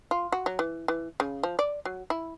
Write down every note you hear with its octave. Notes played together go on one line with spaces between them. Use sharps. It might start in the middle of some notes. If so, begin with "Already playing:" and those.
F4
F#4
F#3
E3
E3
C#3
F3
D5
F#3
E4